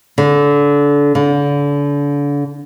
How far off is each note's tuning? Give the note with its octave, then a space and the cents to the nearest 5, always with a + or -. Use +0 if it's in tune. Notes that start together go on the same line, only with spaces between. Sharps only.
D3 -25
D3 -35